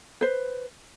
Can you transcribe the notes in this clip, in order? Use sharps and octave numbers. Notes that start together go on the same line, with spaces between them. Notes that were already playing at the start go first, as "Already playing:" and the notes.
B4 C5